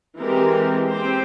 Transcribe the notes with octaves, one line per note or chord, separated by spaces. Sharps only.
E3 G#3 C4 G4 A#4
C4 G4 C5